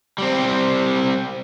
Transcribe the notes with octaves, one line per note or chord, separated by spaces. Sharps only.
G3 C4